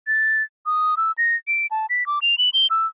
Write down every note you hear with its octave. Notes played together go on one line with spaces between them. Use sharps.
A6
D#6
E6
A#6
D7
A5
B6
D6
F7
F#7
G7
E6